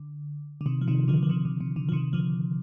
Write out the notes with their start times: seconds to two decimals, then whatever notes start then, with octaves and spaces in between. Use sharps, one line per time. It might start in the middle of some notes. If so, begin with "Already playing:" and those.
Already playing: D3
0.61 D3
0.66 C3 D#3
0.81 F3
0.88 C3 D#3
1.08 D3 F3
1.23 F3
1.29 C3 D#3
1.45 D3
1.60 C3
1.76 D3
1.89 F3
1.92 C3 D#3
2.13 D3 F3